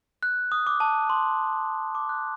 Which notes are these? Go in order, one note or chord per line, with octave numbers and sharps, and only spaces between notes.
F#6
D#6
D6
A5
C6
D6
F#6